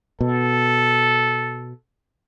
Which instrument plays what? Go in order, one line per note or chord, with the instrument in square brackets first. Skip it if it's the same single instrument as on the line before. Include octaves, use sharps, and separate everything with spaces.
[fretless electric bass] B2 [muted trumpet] A4